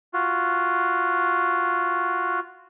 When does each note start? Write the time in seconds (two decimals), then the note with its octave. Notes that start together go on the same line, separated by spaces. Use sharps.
0.13 F4 F#4